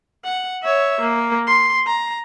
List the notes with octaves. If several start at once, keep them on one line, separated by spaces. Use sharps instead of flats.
F#5
C#5 E5
A#3
C6
A#5